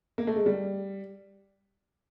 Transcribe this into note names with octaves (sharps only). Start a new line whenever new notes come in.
A#3
A3
G#3
G3